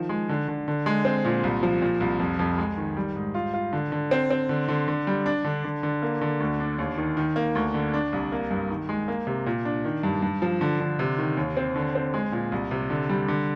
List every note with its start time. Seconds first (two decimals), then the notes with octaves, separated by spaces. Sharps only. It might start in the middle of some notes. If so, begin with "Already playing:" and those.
Already playing: D#3 F3
0.09 G#3
0.29 D3
0.48 D3
0.68 D3
0.86 G#3
1.05 C4
1.25 A#2
1.44 C2
1.63 F3
1.82 A#2
2.00 C2
2.20 F2
2.39 F2
2.58 G#3
2.77 D#3
2.97 G3
3.16 G#2
3.34 F4
3.54 F4
3.73 D3
3.92 D3
4.11 C4
4.30 C4
4.49 D3
4.68 D3
4.88 D3
5.07 G3
5.26 D4
5.44 D3
5.64 D3
5.83 D3
6.02 A#3
6.21 D3
6.40 D2
6.60 D4
6.79 D#2
6.97 D#3
7.17 D#3
7.36 A#3
7.55 D2
7.74 D3
7.94 D4
8.13 C2
8.32 A#3
8.51 G2
8.70 D#3
8.89 G#3
9.08 A#3
9.27 C3
9.46 A#2
9.65 D4
9.84 D#3
10.03 G2
10.22 G2
10.42 F3
10.61 D3
10.80 D3
10.99 C3
11.18 D#3
11.37 D#2
11.57 C4
11.76 D3
11.95 C4
12.14 G#3
12.32 A#2
12.52 C2
12.71 C3
12.90 D3
13.09 G3
13.28 D3